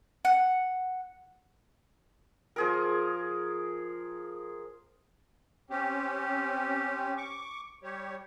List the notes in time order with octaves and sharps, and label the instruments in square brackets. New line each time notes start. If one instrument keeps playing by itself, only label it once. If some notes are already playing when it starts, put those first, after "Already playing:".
[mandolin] F#5
[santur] F3 G#4 A#4
[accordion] C4 C#4 G4
C#6 D6
G3 G4 C#5